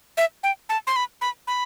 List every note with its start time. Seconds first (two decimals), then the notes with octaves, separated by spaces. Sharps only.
0.17 E5
0.43 G5
0.69 A5
0.87 C6
0.96 B5
1.21 B5
1.47 B5